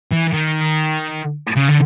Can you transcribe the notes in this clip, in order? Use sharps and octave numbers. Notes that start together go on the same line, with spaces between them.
E3
D#3
C#3
D3